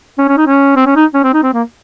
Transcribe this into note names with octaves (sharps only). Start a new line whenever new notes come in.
C#4
C#4
D#4
C#4
C4
C#4
D#4
C#4
C4
D#4
C4
A#3